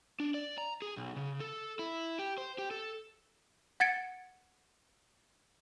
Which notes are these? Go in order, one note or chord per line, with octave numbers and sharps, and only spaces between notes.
D4
D5
A#5
G#4
B1
C#3
A4
E4
G4
C5
G4
A4
F#5 G#6 A6 C#7 D7